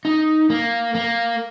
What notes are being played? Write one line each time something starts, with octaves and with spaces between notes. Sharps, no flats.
D#4
A#3
A#3